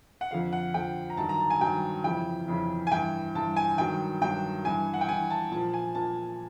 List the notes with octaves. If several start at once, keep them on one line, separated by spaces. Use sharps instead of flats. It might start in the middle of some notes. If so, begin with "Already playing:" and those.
F#5
F2 D3 F3 F5
F#5
F2 D3 F3 G5
A#5
G2 D#3 F#3 A5
A#5
A5
G#5
G2 D#3 F#3 G5
F2 C#3 E3 G5
F2 C#3 E3
G#5
G2 E3 G5
G2 E3 A5
G#5
G2 D#3 F#3 G5
G2 D#3 F#3 G5
G2 E3 G#5
F#5
G5
G2 E3 G#5
A5
A#2 F3 A5
G#5
A#2 F3 A5